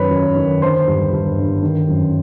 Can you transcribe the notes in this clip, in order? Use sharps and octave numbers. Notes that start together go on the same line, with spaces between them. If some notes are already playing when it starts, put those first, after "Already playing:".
Already playing: F#2 D#3 B4 C#5 B5
F#2
D#3
D3 C5 C6
G2
G2
D3
D#3
F#2